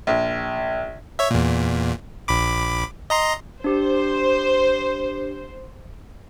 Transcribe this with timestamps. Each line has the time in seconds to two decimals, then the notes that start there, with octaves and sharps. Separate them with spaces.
0.07 A#1
1.19 C#5 E5
1.31 E2 A#2
2.28 A#1 B5 D6
3.10 D#5 A#5 C6
3.64 D4 G4 C5